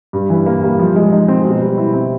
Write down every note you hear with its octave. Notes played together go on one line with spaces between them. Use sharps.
G2
E3
A#3
G3
F3
G#3
D#4
C4
B2
G3
E4
C4